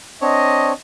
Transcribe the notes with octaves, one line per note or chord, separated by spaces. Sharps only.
C4 D4 C#5 D#5